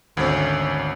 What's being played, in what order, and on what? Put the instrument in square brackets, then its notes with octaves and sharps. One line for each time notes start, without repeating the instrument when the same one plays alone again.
[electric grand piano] G#1 D2 [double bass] C#4